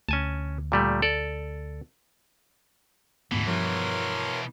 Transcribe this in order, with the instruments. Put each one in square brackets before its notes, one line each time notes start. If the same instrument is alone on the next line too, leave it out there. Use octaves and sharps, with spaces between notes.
[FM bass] D2 [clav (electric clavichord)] C#4 G#5 A5
[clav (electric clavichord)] A#2 G3 A3
A4 D5
[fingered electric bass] D2 G#2 B3 [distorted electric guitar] B2 E3
[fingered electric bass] G2 F3 [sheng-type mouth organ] A#4 C#5 C6